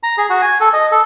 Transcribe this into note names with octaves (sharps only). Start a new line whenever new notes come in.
A#5
G#4
F#4
G#5
A4
D#5
A4